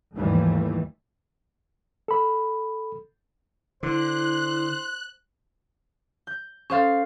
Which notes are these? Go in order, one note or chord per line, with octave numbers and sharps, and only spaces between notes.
D#2 G#2 E3 F3 G3 A3
A4 B5
D3 E4 C5 F#6
G6
C#4 G#4 A4 C5 F5